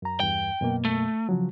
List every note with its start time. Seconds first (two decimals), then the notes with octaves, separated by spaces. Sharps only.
0.02 F#2 A#5
0.20 E2 G2 G5
0.60 F#2 B2 A#3
0.85 A3
1.29 C#3 F3 F#3